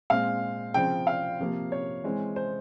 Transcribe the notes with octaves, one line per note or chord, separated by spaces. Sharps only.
A#2 G#3 C4 F5
C#3 F3 C4 G5
F5
C3 F3 A#3
C#5
E3 G#3 C4
C5